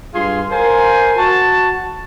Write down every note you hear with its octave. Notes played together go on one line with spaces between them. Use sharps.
G2 F4 G#4 C6
A#4 C5 F5 G#5
F#4 A5